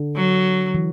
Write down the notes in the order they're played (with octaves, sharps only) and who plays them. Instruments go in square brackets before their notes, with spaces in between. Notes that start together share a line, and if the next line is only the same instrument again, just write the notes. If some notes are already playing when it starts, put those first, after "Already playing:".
Already playing: [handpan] D3
[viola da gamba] F#3
[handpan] E3